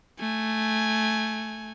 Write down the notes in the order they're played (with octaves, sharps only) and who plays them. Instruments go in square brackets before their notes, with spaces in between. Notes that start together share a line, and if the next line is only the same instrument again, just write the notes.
[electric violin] A3 G#5